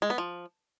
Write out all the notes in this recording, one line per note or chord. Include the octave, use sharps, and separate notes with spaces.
G#3
B3
F3